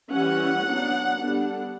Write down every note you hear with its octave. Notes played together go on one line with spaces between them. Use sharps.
E3 G3 C#4 F#5
F#3 B3 D4
D3 G3 B3 D4